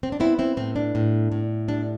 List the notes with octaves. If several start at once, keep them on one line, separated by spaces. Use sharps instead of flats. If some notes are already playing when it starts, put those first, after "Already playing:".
C4
D4
B3 C4 E4
C4 E4
A2 C4
D4
A2
A2
G3 D4